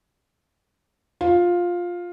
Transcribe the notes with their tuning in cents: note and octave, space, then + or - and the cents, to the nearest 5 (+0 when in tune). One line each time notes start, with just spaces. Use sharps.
F4 +10